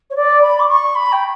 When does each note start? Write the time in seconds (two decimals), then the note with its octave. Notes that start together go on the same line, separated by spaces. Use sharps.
0.10 C#5
0.15 D5
0.41 B5
0.59 D6
0.68 C#6
0.94 B5
1.12 G5